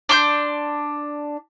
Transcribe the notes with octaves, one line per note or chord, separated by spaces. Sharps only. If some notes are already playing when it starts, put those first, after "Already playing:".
D4 C6 G6